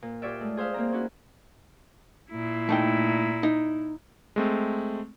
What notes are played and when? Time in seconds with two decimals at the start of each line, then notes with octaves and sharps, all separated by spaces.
0.02 A#2
0.22 F4 G4 C#5 D5 E5
0.40 G#3 A3
0.57 G#4 C5 E5 F5
0.74 A#3 C4 A#5
0.92 C#4 E4 F#4
2.31 A#2 E4
2.69 A3 D#4 G5
3.43 D#4
4.36 G#3 A3 C4